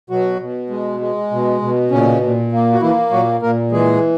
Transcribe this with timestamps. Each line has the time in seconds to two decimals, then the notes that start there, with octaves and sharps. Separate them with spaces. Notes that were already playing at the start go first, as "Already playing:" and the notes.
0.10 B2 F#3 F#4
0.40 B2
0.70 G#3
1.00 G#3
1.31 B2
1.61 B2
1.91 A#2 C#3 C#4
2.21 A#2
2.52 A#3
2.73 F#4
2.81 E3 A#3 E4
3.11 A#2 F#3 F#4
3.42 A#2 A#3 A#4
3.71 E3 G#3 G#4